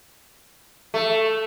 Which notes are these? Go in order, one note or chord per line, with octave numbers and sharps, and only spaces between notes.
A3